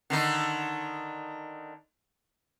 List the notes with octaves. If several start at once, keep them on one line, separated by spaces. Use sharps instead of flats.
D3 D#3 D#4